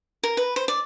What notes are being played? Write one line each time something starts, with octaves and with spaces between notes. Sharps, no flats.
A#4
B4
C5
D5